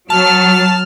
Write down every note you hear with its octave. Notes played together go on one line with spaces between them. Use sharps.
F#3 A5 F6